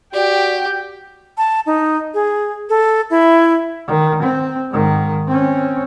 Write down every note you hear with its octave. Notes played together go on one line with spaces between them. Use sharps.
F#4 G4 D5 G5
A5
D#4
G#4
A4
E4
D#3
C4
G#2 D#3
C4 C#4